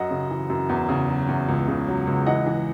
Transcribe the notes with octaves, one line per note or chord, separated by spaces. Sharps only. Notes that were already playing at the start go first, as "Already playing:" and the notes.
Already playing: F#2 D#5 F#5
C#3
E3
F#2
E2
C#3
F#3
E2
C#2
C#3
F#3
C#2
E3 D#5 F#5
E3